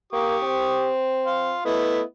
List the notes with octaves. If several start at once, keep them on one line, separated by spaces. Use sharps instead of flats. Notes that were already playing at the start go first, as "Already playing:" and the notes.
A#3 G4 C#6 D#6
C4
F5 C6
A3 B3 E4 D#5